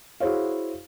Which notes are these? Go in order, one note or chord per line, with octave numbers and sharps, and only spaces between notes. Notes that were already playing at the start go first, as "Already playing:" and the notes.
E4 F#4 G#4 C5 C#5 F5